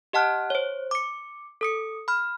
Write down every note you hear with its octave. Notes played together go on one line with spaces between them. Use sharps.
G4 D#5 F#5 A5 F6 F#6
C5 C#5
D6 C#7
A4 D#6 C#7
B5 F6